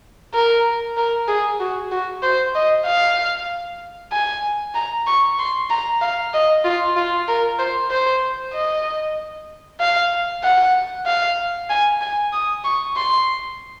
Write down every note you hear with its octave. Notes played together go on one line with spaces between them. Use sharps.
A#4
A#4
G#4
F#4
F#4
C5
D#5
F5
G#5
A#5
C#6
C6
A#5
F5
D#5
F4
F4
A#4
C5
C5
D#5
F5
F#5
F5
G#5
G#5
D#6
C#6
C6